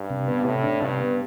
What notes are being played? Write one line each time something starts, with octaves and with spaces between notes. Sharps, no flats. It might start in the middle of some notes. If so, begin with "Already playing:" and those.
Already playing: G2
C3
B3
A2 C3
D4
G2 C3
B3